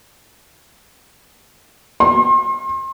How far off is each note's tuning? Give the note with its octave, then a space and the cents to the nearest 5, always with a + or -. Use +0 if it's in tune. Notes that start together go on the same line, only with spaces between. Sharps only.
C6 +40